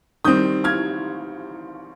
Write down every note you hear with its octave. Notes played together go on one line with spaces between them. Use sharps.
D#3 G3 C4 D#6 G6
F6 G#6